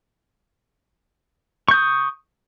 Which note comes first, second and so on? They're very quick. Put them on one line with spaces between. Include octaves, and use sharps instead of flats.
C#6 G6 D#6